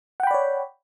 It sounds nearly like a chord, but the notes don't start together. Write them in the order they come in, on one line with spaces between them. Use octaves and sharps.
F#5 G5 B5 D5 C#5